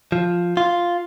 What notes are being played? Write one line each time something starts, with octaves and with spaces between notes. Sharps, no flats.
F3
F4